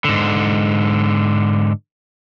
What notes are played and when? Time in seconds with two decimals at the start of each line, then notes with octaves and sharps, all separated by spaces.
0.05 G#2 D3